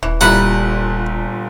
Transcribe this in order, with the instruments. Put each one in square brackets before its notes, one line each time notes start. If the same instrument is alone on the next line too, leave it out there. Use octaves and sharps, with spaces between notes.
[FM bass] D#1 [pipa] E3
[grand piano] G1 A#2 G3 [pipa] D#4 E4 B5 [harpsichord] F#5